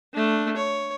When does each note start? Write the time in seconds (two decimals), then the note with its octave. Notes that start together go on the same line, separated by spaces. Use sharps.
0.14 A3 D4
0.57 C#5